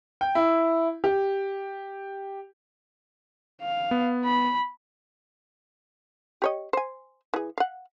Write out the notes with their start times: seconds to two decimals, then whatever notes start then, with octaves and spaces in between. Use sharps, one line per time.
0.21 G5
0.35 E4
1.04 G4
3.61 F5
3.91 B3
4.25 B5
6.42 G4 C#5 D#5
6.73 C5 G#5
7.34 E3 G#4
7.58 F5 F#5